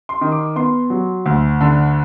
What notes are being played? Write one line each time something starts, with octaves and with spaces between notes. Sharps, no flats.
C6
D#3
D6
B3 C6
F#3
D2
D3